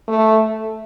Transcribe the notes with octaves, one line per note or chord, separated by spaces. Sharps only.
A3